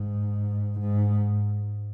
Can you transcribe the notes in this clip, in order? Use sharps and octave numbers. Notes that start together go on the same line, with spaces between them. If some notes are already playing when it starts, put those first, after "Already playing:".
Already playing: G#2
G#2